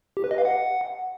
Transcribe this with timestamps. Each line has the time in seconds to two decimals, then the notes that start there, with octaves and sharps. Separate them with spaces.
0.17 G4
0.24 B4
0.31 D#5
0.38 F5
0.45 F#5